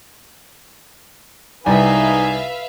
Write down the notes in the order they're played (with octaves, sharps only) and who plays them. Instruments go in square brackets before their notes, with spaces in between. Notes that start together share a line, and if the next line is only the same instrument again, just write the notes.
[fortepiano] C2 [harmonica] D#4 G#5 [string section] B4 E5 F5